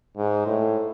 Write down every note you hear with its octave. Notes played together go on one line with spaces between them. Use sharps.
G#2
A2